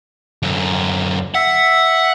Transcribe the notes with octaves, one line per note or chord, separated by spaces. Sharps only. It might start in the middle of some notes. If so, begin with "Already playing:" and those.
F#2 D3
E5 F#5